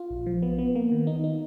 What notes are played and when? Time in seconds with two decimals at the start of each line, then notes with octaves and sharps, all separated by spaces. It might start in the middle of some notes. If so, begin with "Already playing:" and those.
Already playing: F4
0.10 A#1
0.26 F3
0.42 B3
0.59 B3
0.75 A#3
0.92 D#3
1.07 D#4
1.24 D#4